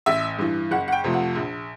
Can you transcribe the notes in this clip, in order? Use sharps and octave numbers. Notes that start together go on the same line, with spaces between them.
A1 E5
G2 E3
F#1 F#5
F#5
G5
F2 C3 F3 A3
F#5
A#1